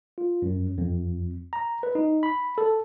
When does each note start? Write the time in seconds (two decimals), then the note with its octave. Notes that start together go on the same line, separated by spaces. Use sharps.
0.18 F4
0.42 F#2
0.78 F2
1.53 A#5
1.83 B4
1.95 D#4
2.23 B5
2.58 A4